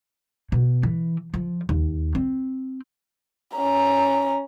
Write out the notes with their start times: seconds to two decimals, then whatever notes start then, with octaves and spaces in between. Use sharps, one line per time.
0.52 B2
0.83 E3
1.34 F3
1.69 D#2
2.15 C4
3.57 C#4 A#5